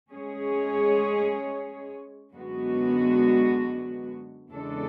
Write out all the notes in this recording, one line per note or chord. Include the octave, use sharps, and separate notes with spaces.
G#3 C#4 G#4 C#5
F#2 D3 G#3 B3 F#4
E2 C#3 G#3 D4 A4